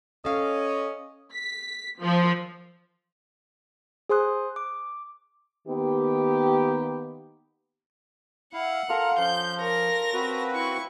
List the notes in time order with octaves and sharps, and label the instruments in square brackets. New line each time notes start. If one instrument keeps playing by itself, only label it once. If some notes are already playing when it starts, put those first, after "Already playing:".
[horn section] C#4 [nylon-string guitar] A4 F5 [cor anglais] D#5
[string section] B6
F3
[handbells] G#4 C5 G#5 C6 D#6 F#6
D6
[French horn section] D#3 A#3 B3 G4
[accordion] E4 F5 [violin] F#5
[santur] F4 A4 F5 [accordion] A#4 A#5
[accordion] F3 [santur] C#4 C6 [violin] G6
[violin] A#4 A#6 [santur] C#5
[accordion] C4 F#4 B4
[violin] E4 C#6